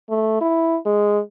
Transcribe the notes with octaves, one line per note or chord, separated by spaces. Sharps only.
A3
E4
G#3